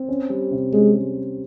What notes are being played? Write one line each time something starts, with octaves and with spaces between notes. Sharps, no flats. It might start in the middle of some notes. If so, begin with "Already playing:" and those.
Already playing: C4
C#4
G3
C3
G#3 C#4
G3